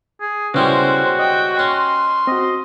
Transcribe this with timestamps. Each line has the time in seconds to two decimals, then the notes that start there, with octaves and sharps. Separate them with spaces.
0.21 G#4
0.54 B1 C#3 G3 G#3 C#4 E4 F#4 C5
1.19 D#5 G5
1.59 C#4 C6
2.27 C4 F#4 D#5